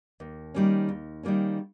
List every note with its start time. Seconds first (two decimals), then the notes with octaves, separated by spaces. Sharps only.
0.20 D#2
0.54 D#3 G3 A#3 C#4
0.89 D#2
1.23 D#3 G3 A#3 C#4